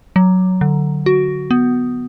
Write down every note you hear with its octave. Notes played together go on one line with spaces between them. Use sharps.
F#3
D3
F#4
B3